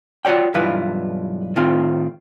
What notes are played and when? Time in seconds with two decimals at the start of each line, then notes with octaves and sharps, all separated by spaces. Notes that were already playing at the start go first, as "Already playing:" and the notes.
0.25 F4 F#4 C#5 D5 G5
0.54 B1 G2 E3 E4 F4 B4
1.56 A2 D#3 C4 F4